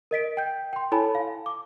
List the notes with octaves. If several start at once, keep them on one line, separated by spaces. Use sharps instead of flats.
A#4 D#5 B6 D7
G5 G6
G5 C6
E4 A4 C#5 G#5 A5 B5
F5
D6